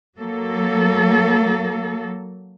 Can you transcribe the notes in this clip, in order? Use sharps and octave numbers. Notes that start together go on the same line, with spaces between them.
F#3 A#3 A4